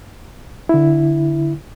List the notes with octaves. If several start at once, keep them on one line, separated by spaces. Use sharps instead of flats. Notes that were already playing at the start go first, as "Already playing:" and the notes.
D3 E4